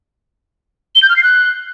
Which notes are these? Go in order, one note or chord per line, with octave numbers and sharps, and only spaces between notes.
G7
G6
F6
C7
F#6